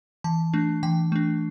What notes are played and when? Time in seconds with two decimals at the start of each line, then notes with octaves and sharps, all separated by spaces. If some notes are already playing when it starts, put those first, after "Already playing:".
0.24 E3 A5
0.53 A3 D4
0.83 E3 G5
1.12 A3 D4